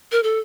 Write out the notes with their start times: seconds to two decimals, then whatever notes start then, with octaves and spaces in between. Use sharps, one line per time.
0.12 A#4
0.23 A4